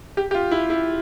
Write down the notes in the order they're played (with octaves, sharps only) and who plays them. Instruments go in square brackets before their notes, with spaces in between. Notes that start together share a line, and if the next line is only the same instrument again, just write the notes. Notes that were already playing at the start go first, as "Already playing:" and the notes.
[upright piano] G4
G4
F4
E4
E4